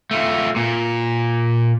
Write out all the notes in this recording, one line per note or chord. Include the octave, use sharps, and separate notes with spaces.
A3 F4
A#2